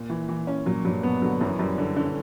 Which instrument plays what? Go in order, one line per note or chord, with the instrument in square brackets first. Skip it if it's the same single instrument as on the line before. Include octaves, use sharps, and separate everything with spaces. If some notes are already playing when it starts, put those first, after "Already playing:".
Already playing: [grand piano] A#2
[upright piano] E3
E3
C#4
[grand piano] A#2 [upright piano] F#3
[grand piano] G2 [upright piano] F#3
[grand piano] B2 [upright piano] B3
[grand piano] D3 [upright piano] F#3
[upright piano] F#2 [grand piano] E3
[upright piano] F#2 [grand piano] G3
[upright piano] D3
[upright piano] D3 [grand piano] C#4
[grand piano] C#4